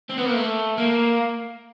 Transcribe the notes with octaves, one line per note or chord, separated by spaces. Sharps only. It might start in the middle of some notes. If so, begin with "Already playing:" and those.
C4
B3
A#3
A3
A#3